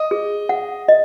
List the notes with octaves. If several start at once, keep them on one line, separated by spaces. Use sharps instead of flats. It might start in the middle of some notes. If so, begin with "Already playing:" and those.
Already playing: D#5
G#4
F#5
D#5